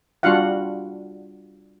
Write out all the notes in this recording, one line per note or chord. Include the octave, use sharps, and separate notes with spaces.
G3 D4 F4 F#4 F5 F#5